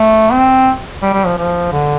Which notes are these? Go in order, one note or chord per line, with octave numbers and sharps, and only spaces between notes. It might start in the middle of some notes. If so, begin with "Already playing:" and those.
Already playing: A3
C4
G3
G3
F3
F3
D3